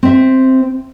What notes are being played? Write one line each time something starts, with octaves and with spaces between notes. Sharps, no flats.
C4 E5